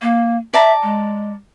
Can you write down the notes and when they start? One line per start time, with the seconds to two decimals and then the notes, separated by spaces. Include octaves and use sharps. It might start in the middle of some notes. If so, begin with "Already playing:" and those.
0.02 A#3
0.54 D5 E5 A5 A#5
0.83 G#3